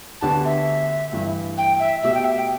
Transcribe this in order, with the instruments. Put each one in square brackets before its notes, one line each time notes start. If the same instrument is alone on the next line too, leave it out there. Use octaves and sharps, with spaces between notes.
[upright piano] D2 D3 B3 D4 G4 [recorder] A5
[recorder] E5
[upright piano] G2 E3 A3
[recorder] G5
E5
[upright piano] B2 A3 G4 [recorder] E5
[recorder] G5
E5
G5